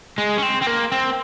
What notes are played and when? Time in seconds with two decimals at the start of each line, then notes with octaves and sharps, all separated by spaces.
0.18 G#3
0.38 C#4
0.43 C4
0.62 C4
0.67 A#3
0.92 C4